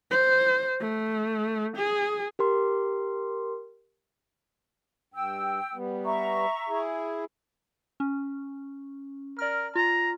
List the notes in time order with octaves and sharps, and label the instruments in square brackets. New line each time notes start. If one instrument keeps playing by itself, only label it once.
[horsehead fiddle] C5
A3
G#4
[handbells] G4 A#4 C6
[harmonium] G2 [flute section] G5 E6
[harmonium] G3 B3
[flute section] E5 A#5 C#6
[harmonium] E4 G#4
[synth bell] C#4
[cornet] A#4 [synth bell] D5 F6
[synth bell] F4 [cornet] A#5